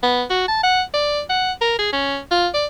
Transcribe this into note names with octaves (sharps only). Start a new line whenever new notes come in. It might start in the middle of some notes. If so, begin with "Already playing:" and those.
B3
F#4
A5
F#5
D5
F#5
A#4
G#4
C#4
F4
D5